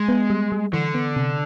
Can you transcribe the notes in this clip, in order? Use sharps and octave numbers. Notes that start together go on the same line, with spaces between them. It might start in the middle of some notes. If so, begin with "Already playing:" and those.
Already playing: G#3
B3
G3
G3
D3 E3
B3
C3